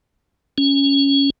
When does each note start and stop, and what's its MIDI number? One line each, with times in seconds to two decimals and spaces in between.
0.58 1.30 61